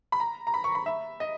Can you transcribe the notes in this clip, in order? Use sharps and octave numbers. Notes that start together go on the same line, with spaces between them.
B5
A#5
A#5
B5
C#6
B5
E5
D#5